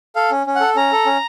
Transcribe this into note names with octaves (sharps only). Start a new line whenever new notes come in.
A4 F5
C#4
C#4
F#5
A4
C#4 A#5
A4
C#4